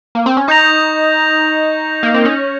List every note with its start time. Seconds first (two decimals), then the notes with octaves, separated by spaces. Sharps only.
0.15 A#3
0.26 C4
0.37 C#4
0.48 D#4 C#6 G6 A#6 F7
2.03 A#3
2.14 C4
2.25 C#4